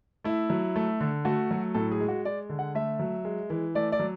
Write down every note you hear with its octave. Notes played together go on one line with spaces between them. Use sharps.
A3 E4
F#3
A3
D3
A3 F#4
F#3
A2 A4
G#4
G#3
F#4
G#3 D5
D3
F#5
A3 E5
F#3
G#3
E3
A3 D5
D5
F#3